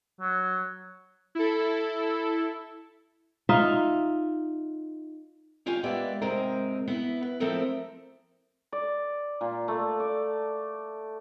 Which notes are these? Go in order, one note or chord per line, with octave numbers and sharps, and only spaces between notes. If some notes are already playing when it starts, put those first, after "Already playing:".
F#3
E4 A4
D#4 F4 E5
D#2 C#4 F4 G4 C#5 G#5
G#3 A#3 B3 G4 D5 E5
G#2 C3 G#3 C4 A#4
B3 E4
B4
F3 A3 C4 E4 A4 A#4
D5
A#2
A3
D5